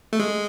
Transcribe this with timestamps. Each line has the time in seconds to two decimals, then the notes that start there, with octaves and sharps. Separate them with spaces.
0.13 A3
0.20 G#3